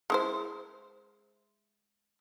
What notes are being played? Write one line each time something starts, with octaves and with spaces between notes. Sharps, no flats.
G#3 E4 C5